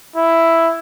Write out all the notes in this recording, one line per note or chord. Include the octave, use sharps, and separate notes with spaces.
E4